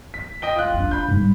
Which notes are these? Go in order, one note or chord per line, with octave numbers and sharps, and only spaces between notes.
B6
D#5 G5 G7
F4 F#6
C#4 D4
B5 G6
G#2 G3